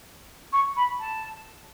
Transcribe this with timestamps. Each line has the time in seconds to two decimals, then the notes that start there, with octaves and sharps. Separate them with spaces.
0.52 C#6
0.76 B5
0.99 A5